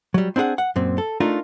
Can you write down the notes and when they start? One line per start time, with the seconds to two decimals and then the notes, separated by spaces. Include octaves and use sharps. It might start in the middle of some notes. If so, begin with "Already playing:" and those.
0.14 F#3 G3
0.36 C4 D4 E4 G#4 F#5
0.58 F#5
0.76 F#2 A#2 C4
0.98 A4
1.20 A3 D4 D#4 F4 A#4